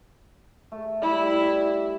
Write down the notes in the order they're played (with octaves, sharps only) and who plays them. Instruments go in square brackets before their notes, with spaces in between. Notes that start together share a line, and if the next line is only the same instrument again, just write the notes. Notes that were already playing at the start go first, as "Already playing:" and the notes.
[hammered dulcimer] A3
[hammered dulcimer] G3 E5 G5 [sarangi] E4
[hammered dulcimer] D5